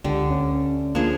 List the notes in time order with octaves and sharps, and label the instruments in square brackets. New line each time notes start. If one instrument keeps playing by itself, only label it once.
[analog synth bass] C#2 [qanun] D3 [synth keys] G4
[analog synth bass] D2 [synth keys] C#4
[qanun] F3 G#4 [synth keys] A#3 [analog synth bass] D4